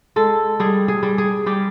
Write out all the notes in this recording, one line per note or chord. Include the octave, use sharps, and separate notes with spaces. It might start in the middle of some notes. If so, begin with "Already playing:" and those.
G#3 A4
G3 G#4
G#4
G3
G#4
G3 G4